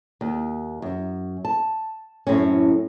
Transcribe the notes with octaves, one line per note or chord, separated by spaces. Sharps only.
D#2
F#2
A5
F#2 A2 C4 C#4